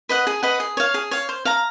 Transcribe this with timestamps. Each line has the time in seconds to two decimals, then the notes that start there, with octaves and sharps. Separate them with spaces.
0.09 B4 D#5 F#5
0.27 G#4
0.43 B4 D#5 F#5
0.60 G#4
0.77 C#5 F5
0.94 G#4
1.11 C#5 F5
1.29 C5
1.45 F5 A#5